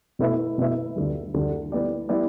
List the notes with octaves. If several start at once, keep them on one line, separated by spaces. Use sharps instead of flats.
B2 A3 E4 B4 E5
B2 A3 E4 B4 E5
D2 D3 G3
D2 D3 G3
G3 B3 E4 G4 D5
G3 B3 E4 G4 D5